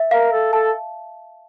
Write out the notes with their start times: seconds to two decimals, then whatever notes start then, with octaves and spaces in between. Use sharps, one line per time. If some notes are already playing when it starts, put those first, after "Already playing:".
Already playing: E5
0.11 A#4 F5
0.32 A4
0.53 A4 A5